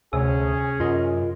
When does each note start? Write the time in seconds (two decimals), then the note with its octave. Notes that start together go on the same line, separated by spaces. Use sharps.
0.13 D2 C3 C#4 G#4
0.80 F#2 F4 A#4 D#5